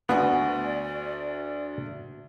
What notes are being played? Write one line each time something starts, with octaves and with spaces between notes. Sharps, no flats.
D2 A3 B3 F#4 D5 G#5